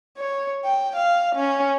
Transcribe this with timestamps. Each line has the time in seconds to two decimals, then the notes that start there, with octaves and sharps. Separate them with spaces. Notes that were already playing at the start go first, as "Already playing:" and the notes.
0.18 C#5
0.65 G5
0.96 F5
1.35 C#4